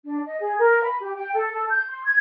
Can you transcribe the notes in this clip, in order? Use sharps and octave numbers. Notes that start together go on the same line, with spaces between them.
D4
D#5
G#4
A#4
B5
G4
G5
A4
A4
G6
C6
G#6